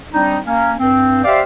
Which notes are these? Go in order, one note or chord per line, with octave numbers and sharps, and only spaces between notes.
G3 C4 D4 D#4
A#3 C#4
G2 C4
G4 C5 D5 E5 F5